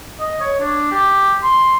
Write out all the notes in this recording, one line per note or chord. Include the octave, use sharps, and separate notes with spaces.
D#5
C#5
D4
G4
C6